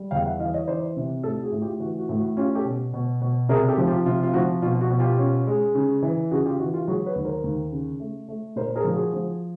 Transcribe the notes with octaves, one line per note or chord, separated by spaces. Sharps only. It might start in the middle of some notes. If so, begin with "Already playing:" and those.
Already playing: G3
E2 F5 G5
E5 F#5
E3 D#5 F5
C#5 D#5
E3 C5 D5
C3
A2 G4 A4
F#4 G#4
A2
F4 G4
E3 F#4
F#4
A2
F#4
C#4 F4 G4
G4 A4
B2
B2
B2
C3 G#4 A#4
G4 A4
F3
F4 G4
C3 F4
F4
F3 F#4
B2 F4
F#4
B2
F4 G4
C#4
G#3
C#3
E3
C#3 F#4 G#4
F4 G4
E3 F#4
F4 G4
F#3 F#4 G#4
B4 C#5
D#2
A#4 C5
D#2
C#3
A3
A3
A#2 A#4 C5
G#4 A#4
F3
F#4 G#4
F3